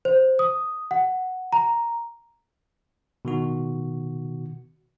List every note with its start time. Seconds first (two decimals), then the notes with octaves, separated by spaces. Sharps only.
0.05 C5
0.39 D#6
0.91 F#5
1.53 A#5
3.25 B2 D#3 F#4